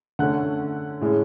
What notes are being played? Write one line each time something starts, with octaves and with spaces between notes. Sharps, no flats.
D3 A3 C#4 F#5 F#6
A2 G#3 C#4